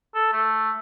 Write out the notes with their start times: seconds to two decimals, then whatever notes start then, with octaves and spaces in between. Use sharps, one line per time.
0.15 A4
0.33 A3